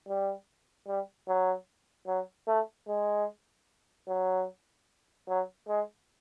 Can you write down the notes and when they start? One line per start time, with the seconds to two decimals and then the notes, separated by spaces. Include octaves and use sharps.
0.08 G3
0.88 G3
1.28 F#3
2.07 F#3
2.48 A3
2.88 G#3
4.08 F#3
5.29 F#3
5.68 G#3